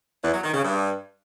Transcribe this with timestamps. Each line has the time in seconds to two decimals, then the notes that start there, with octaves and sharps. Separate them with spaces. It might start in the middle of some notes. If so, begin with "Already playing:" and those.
0.24 E2
0.34 F#3
0.44 D#3
0.54 C#3
0.64 G2